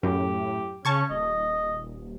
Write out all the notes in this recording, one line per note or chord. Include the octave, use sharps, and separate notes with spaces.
F#2 A2 G4
C#3 C#4 A5 C#6 G#6
D#1 D#5